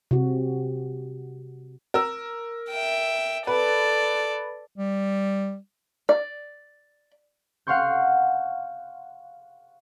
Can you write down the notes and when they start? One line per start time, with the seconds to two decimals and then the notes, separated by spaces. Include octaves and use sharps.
0.11 C3 F#4
1.94 A#4 E6
2.71 E5 G5
3.47 A4 B4 D5
4.77 G3
6.09 D5
7.67 F5 F#5 C6 C#6 G6